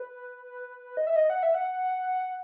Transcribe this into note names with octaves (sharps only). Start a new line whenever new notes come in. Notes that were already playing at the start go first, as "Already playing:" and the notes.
Already playing: B4
D#5
E5
D#5
F#5
E5
F#5